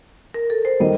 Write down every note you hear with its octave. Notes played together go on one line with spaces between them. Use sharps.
A#4
A4
C5
D#3 G3 D#5